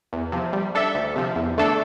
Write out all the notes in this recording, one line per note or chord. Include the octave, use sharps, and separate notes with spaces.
E2
C3 F3
G3
D4 A4 E5
D2
C3 F3
E2
D3 A3 D4 A4